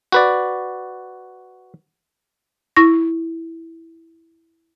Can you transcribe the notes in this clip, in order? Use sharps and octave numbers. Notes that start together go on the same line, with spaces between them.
F#4 B4 D5
E4 C#6 A#6